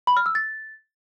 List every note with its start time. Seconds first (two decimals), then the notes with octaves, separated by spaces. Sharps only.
0.07 B5
0.17 F6
0.26 E6
0.35 A6